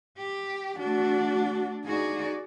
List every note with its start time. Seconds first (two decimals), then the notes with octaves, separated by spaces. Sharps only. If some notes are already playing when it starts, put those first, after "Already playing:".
0.18 G4
0.79 A3 D4 F#4
1.86 D#4 F#4 G#4 D5